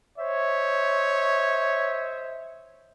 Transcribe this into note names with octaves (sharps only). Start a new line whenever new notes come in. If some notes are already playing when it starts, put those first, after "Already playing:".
C5 C#5 D#5 E5